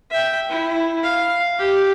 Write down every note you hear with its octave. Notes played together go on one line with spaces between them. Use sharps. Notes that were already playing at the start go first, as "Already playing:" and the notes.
E5 G5
E4
F5
G4